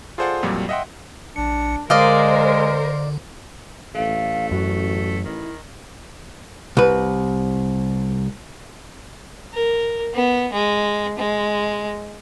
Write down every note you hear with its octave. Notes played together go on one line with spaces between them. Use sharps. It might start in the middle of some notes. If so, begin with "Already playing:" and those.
F4 G#4 A4 C5 D5 F#5
F2 A#2 F#3 G3
D#5 E5 F#5 G5 C6
A#1 D4 C#7
D3 G#3 A#4 C5 D5 D#5 F5
A1 A3 F5
F#2 F#4
D#3 E4
C2 B4
A#4
B3
G#3
G#3